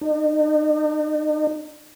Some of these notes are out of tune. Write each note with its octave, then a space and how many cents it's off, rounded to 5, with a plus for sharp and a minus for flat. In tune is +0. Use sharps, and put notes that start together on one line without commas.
D#4 -40